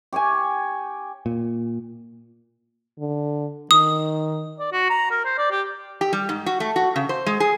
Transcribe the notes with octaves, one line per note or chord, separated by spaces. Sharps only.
G4 C#5 G5 G#5
A#2
D3
D#3 D#6
D5
F#4
A#5
A#4
C5
D5
G4
G4
G3
G#2
F#4
A3
F#4
C#3
C5
G#3
G#4